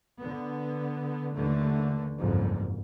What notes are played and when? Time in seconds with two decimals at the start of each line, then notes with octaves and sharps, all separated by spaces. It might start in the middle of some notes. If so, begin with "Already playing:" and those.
0.19 D3 B3
1.34 D#2 D3 E3 A3
2.19 F#1 C2 F2 G#2